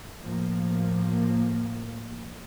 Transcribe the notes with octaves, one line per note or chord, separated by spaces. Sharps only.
A2 F3 A#3